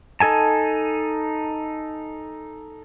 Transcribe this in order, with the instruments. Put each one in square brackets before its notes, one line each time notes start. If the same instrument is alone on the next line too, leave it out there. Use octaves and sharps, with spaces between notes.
[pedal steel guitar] D#4 A4 G#5 A5